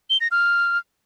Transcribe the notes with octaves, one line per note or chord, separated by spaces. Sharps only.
G7
A#6
F6